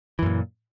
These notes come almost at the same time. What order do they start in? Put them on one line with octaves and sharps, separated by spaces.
E3 F#2 A#2